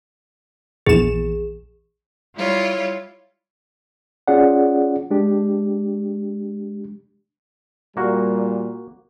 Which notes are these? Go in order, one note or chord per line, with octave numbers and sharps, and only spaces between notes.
A#1 E2 G#4 E7
G3 E4 F4 C#5
C#4 F4 G#4 D5 F#5
G#3 D4 G4
A#2 G3 A#3 F#4